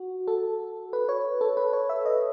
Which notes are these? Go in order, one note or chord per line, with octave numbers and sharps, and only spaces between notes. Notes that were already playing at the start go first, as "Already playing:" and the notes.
Already playing: F#4
A4
B4
C#5
A4
B4
C#5
E5
D#5